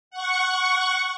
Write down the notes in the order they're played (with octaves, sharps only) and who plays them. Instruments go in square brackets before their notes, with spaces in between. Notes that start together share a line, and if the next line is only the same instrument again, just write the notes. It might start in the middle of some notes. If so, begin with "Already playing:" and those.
[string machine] F#5 C#6